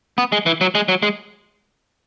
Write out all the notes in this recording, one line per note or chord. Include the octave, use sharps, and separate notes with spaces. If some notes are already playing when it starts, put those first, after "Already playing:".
B3
G#3
E3
F#3
G#3
F#3
G#3